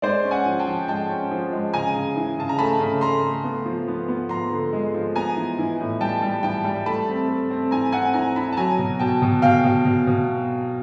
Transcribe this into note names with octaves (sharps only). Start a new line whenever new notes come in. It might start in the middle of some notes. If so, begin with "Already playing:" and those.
G#3 C5 D5
C#4
F#5 G#5
F3
G5 A5
F3
G#3 G5 A5
C#4
F3
G#3
C#3 G#5 A#5
C#3
E3
C#3 A5
A#5
A3 A5 B5
C#3
A3 A#5 C6
A3
B3
F3
B3
B3
F3 A#5 C6
D3
G#3
F3
B3 G#5 A#5
E3
E3
A2
G3 G5 A5
G3
E3 G5 A5
G3
A3 A5 B5
C4
A3
C4
E3 G#5 A#5
C4 F#5 G#5
E3 G#5 A#5
E4 A5 B5
A5
F#3 G#5 A#5
B2
B2 G5 A5
B2
B2 F5 G5
B2
B2
B2